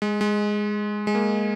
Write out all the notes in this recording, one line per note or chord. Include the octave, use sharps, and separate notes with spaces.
G#3
G#3
G#3
A#3